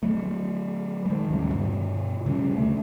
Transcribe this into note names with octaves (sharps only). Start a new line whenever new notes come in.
F#3 A3
D#3 G#3
A1 D#2 C#3 G3
G2 B2
C#3 G3 C#4
D2 F#3 A3